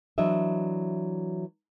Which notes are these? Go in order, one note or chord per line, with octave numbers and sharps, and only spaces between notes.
E3 F#3 D4 D#5 E5